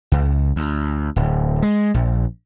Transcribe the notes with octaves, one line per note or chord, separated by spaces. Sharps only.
C#2
D2
D1
G#3
A#1